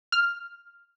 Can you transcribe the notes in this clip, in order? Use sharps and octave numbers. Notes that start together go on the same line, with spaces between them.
F6